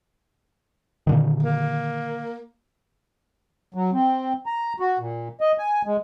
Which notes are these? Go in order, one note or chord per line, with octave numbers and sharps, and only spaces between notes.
A#2 D3 D#3
A#3
F#3
C4
A#5
F#4
A#2
D#5
G#5
G#3